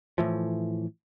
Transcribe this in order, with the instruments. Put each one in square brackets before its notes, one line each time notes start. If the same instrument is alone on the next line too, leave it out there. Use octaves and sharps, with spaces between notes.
[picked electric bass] A2 E3 F3